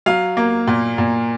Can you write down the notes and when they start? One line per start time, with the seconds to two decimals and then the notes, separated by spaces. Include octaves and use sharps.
0.06 F#3 F5
0.37 A#3
0.67 A#2
0.98 A#2